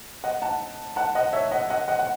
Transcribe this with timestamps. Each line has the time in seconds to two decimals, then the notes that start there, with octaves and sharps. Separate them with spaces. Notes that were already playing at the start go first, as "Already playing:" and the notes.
0.24 D#5 F#5
0.42 F#5 A5
0.96 F#5 A5
1.15 D#5 F#5
1.33 C#5 E5
1.51 D#5 F#5
1.70 D#5 F#5
1.88 D#5 F#5
1.99 F#5